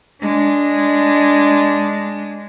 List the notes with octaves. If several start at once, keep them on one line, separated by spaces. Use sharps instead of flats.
G#3 D4